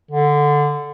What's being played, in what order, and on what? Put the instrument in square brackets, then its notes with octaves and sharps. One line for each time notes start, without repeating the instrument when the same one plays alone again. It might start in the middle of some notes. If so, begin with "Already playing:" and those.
[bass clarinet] D3